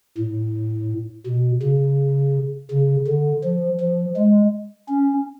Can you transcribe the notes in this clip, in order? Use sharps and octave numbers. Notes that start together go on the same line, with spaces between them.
A2
B2
C#3
C#3
D3
F3
F3
G#3
C#4